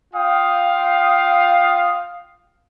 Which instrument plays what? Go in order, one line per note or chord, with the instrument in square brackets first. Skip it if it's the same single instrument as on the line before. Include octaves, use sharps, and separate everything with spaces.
[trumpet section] F4 F5 G5 D#6